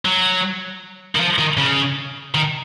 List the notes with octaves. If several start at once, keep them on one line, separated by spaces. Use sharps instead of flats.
F#3
D#3
F3
D#3
C#3
D#3